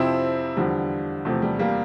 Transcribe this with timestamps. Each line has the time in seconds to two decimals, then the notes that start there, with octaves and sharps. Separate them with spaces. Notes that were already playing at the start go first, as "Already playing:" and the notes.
Already playing: F2 C3 F3 C4 E4
0.57 E2 D3 F3 G3
1.25 E2 C3 F3 A3
1.42 G3
1.59 G3 A#3